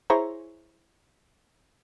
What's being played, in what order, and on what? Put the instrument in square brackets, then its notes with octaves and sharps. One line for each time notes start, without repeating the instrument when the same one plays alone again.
[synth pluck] E4 G#4 C5 C#5 A#5